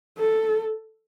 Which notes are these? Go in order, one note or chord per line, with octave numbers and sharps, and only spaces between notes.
A4